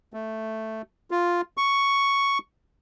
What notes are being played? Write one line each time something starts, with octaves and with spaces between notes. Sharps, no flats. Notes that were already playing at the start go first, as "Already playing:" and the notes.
A3
F4
C#6